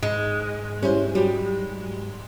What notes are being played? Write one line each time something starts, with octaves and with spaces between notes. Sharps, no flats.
G#2 G#3
G3 C#4 E4 C5
F#3 G3 G4